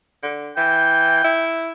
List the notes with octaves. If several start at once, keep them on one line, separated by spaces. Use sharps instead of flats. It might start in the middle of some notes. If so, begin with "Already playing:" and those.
D3
E3 G5
E4